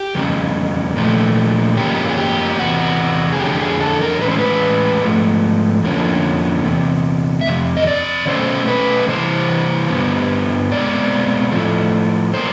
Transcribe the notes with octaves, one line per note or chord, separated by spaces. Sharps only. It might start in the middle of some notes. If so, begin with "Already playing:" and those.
Already playing: G4
F2 C#3 G3
A#2 F3 A3
F#2 C#3 F3 A#3 C#4 G4
G#4
G4
E2 C3 F#4
G#4
F2 D3 F#3 G4
G#4
A4
A#4
A2 E3 G#3 C#4 B4
C5
B4
G#2 F3 A3
F2 D3 F3 A#3 C#4
E2 C3
E5
F2 C3
D#5
D5
B2 F#3 A3 C#4 C5
B4
C3 E3 G3 C5
G2 D3 G3 B3
B2 G#3 C4 D5
A2 F3 A3
B2 F#3 A#3 C5